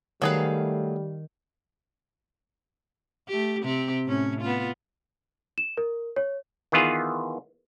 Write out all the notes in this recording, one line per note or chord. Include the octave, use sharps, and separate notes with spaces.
D#3 F#3 G3 A3 G#4 B4 F5
A3 G4
C3 C4 G4
A2 C#4
B3 F4
E7
A#4
C#5
D#3 E3 B3 F4 G#4